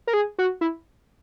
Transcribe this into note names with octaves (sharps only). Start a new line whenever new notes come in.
A#4
G#4
F#4
E4